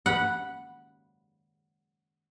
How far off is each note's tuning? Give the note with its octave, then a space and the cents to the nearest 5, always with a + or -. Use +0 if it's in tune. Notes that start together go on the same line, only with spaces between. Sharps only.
F#5 +0 B5 -15